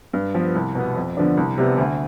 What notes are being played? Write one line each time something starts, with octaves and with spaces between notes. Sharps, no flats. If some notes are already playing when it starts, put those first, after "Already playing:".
G2
F3 B3
C2
B2 B3
F2
D3 F3 B3 D4
C2
C3 G3 B3
D2